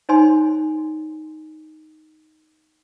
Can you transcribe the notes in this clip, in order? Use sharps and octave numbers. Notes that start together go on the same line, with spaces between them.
D#4 C5 C#5 G#5 C6